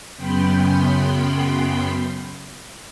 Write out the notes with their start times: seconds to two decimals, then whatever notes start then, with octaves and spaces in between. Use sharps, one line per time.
0.17 F#2 C#3 B3 G5 B5 C6